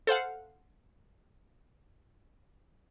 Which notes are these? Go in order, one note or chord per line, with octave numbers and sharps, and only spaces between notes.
A4 C5 F5 F#5